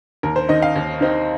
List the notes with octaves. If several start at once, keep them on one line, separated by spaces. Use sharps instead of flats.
D#2 A#4
C5
D#3 C4 D#4 D#5
F5
D#2
D#3 C4 D#4